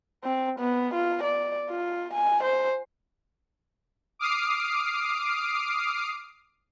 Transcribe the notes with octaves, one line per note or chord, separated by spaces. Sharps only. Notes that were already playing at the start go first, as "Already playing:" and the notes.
C4
B3
F4
D5
F4
G#5
C5
D6 D#6 F6 C7 D7